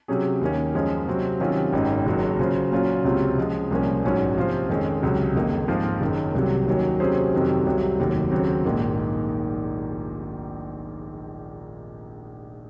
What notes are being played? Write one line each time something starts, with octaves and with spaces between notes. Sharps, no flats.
C3 F#3 C#4 G#4
D#2 D#3 A#3 C#4
F#2 F3 G#3 C#4
C3 F#3 C4
C3 D#3 F#3 C#4 F4
G#1 F#2 D#3 G#3 D#4
F#1 F#2 D#3 F#3
C#3 F#3 C#4 F4 C5
A#2 F#3 C#4 F4
C#2 C3 F#3 C4 F4
C#3 F3 G#3
C2 A#2 F3 A#3 C#4
A#1 G#2 F#3 C#4
C3 F3 C4 F4 C5
F2 D#3 G#3 C#4
C#2 C3 F#3
F#1 F2 D#3 A#3 D#4
G#2 F3 C4 F4 C5
F#1 F#2 D#3
C2 C3 F#3
D#2 D#3 F#3 C#4
C3 F#3 C#4 G#4 C5
F2 C3 D#3 F#3
C2 C3 F#3
F1 D#2 D#3 F#3
D#2 C#3 F#3 C4
A#1 G#2 D#3 A#3